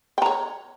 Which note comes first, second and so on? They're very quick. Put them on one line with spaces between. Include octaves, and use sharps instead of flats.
G5 A#5 C#5